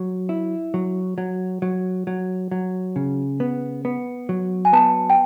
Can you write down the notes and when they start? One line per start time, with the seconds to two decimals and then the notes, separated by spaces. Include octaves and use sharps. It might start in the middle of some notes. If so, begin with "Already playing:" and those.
Already playing: F#3
0.29 E4
0.74 F#3
1.18 F#3
1.62 F#3
2.07 F#3
2.51 F#3
2.96 C#3
3.40 B3
3.85 B3
4.29 F#3
4.65 G#5
4.73 B3 A5
5.10 G5